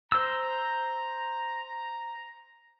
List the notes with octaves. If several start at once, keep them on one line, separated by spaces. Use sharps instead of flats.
C5 A#5 E6